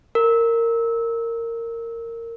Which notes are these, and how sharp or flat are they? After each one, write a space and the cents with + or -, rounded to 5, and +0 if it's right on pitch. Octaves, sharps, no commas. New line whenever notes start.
A#4 -15